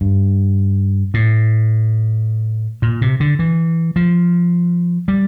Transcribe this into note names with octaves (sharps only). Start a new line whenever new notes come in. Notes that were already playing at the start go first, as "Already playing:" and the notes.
G2
A2
A#2
C3
D3
E3
F3
G3